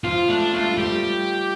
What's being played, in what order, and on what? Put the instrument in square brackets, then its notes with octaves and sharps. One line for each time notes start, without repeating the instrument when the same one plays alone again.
[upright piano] F3 [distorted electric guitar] F4
[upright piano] A3 [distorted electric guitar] D4
[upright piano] A3 [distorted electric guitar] F4
[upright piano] G3
[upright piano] F3 [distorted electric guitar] G4
[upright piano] G3